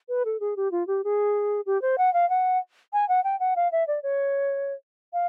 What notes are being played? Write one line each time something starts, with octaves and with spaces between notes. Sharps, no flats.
B4
A4
G#4
G4
F4
G4
G#4
G4
C5
F#5
F5
F#5
G#5
F#5
G5
F#5
F5
E5
D5
C#5
F5